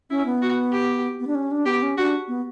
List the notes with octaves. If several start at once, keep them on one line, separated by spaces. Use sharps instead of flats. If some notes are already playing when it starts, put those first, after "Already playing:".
C#4 E4
B3
F#4
G4
B3
D4
C#4
D4
B3 G4
C#4
D4 F#4
B3